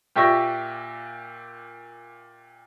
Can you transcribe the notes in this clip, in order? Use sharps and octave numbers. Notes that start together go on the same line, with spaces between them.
A#2 G4 D5 E5 C#6 A#6